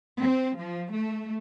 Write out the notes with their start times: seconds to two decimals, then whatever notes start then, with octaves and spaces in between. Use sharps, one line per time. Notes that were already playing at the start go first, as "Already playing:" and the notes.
0.19 C4
0.57 F3
0.93 A3